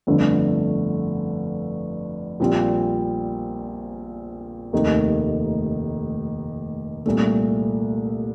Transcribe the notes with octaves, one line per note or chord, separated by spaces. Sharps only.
G1 F2 D3 A3 D4
A#1 A#2 G3 C4 F4
F1 D#2 D#3 A3 D#4
C2 A#2 A3